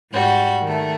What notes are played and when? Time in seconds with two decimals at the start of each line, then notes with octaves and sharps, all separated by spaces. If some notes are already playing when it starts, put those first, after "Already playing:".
0.13 G#2 G3 F#4
0.63 D#3 A3